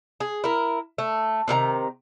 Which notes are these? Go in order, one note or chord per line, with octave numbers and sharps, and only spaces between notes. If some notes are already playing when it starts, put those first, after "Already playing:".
G#4
E4 A#4
A3
C3 D#3 A#4 A#5